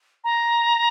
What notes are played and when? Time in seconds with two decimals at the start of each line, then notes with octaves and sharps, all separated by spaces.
0.24 A#5